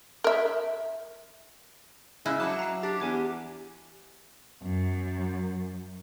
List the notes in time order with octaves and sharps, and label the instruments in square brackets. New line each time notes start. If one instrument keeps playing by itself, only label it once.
[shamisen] A#4 E5
[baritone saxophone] C#3 [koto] E4 [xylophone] D#5 G#5 F#6
[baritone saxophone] F#3 [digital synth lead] A5 [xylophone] D6
[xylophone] A#5 C7
[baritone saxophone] D4 [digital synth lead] G4 [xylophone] A6
[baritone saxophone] E2 [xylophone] G#5 D6 G#6
[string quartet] F#2